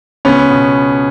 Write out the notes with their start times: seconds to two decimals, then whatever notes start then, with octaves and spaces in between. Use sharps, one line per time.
0.25 C#2 B3 C#4
0.51 B2